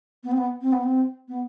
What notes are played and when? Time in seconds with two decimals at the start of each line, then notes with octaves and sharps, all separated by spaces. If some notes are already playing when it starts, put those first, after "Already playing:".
0.24 B3
0.31 C4
0.38 B3
0.61 C4
0.72 B3
0.83 C4
1.28 B3